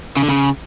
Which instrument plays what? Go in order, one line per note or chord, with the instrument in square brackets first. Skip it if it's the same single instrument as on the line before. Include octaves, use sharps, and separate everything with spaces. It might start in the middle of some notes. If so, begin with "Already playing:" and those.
[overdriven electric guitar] C#3
D3
C#3